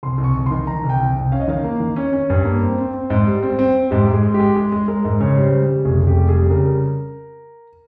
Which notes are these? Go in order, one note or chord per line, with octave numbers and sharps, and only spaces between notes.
C2 C6
C2
C#6
C2
D#3 C6
D#3 A#5
C2
G5
C2
G5
C2
C#4 F5
D#5
D#3 F5
A#3
D#3
C#4
C#4
G2
A#3
C4
C4
C4
G#2
G3
C4
C4
C4
G#2 G4
G#2
G#4
G#3
G4
G#3
G#3 G#4
G#3
G#3 A#4
G#2
C#3 C#5
G3
C5
G3
C#3
F1 G#4
F1
G4
G3
G#4
G3
C#3 A#4